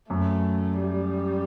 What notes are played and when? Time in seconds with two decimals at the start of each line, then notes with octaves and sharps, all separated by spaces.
0.10 F#2 A3
0.79 G3